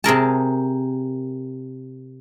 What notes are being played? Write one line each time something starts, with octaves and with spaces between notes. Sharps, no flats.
C3 G#4 A#4 A5